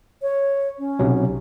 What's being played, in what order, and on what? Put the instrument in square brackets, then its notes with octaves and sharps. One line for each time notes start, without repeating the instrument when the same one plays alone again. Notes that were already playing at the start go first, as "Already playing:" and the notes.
[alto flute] C#5
C#4
[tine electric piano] B1 C3 F#3